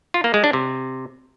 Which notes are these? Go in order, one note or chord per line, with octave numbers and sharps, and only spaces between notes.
F4
A#3
G#3
D4
C3